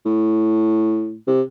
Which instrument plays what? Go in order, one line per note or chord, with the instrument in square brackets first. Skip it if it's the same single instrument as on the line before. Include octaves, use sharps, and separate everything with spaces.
[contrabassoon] A2
C3